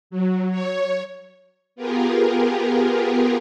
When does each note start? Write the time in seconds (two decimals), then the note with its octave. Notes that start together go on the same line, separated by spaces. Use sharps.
0.10 F#3
0.51 C#5
1.76 B3 F4 G4 G#4 A#4